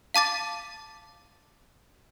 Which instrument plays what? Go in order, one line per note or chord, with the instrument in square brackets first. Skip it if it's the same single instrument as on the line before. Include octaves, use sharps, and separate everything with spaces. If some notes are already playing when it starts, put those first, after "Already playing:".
[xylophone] F5 A5 D6 A6